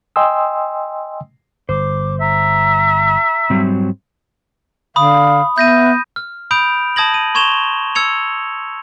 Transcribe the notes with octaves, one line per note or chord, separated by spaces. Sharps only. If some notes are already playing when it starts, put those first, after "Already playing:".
D#5 G5 G#5 C6 D#6 E6
G1 C5 D6
E5 A#5
G#2 F#3 G3 C4
D3 F5 B5 D#6
B3 E5 G6 A#6 D#7
F6
B5 D#6 G6 D7 F7
A5 D#6 G#6 A#6 F#7
D#7
C6 C#6 G#6 E7 F7 G7
E6 G#6 C#7 F7